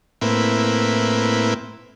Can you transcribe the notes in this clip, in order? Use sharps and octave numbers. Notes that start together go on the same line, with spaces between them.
A2 A#3 C4 E4 B4